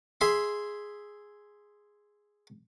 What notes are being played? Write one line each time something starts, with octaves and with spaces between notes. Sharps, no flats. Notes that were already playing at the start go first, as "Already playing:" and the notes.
G#4 E5 C6